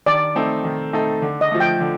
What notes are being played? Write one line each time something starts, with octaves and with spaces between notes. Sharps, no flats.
D#3 D5
A3 C4 D#4 A4
D#3
A3 C4 D#4 A4
D3
D#5
F3 A3
G5
D3